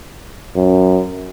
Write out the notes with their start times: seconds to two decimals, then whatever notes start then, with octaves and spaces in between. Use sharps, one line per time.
0.56 F#2